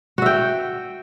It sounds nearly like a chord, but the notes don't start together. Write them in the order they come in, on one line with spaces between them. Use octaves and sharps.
F#4 E5 G5